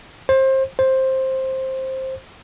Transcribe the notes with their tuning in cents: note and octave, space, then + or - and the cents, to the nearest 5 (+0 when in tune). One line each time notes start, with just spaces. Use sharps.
C5 +25
C5 +10